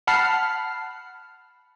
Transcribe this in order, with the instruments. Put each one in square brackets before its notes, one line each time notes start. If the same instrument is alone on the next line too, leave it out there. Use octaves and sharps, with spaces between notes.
[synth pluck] F#5 A5 B5 F6 C7